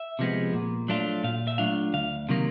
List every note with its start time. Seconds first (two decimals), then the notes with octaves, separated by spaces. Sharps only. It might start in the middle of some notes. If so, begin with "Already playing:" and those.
Already playing: E5
0.19 C3 F3 G#3 B3
0.53 A#2
0.88 F#3 A3 D4 F4
1.24 A#2 F5
1.47 E5
1.58 F#3 A3 D4 F4 F5
1.93 D2 F5
2.29 C3 D#3 F#3 A#3